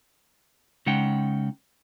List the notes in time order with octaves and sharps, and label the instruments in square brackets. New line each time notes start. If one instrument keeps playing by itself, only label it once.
[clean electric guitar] C#3 G#3 D#4 F#5 G5